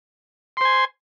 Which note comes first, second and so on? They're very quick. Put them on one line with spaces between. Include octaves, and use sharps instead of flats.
C6 C5 G#5